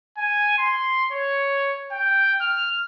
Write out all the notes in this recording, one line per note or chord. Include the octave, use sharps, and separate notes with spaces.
G#5
C6
C#5
G5
F6